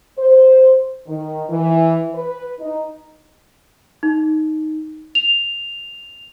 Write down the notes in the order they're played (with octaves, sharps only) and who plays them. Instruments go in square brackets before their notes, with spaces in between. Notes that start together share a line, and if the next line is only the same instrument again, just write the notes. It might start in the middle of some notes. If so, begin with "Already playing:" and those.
[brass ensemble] C5
D#3
E3
B4
D#4
[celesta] D#4
F7